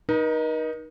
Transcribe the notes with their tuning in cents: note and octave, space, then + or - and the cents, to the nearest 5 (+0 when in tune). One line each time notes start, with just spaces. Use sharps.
D#4 +0 A#4 +45 D#5 +0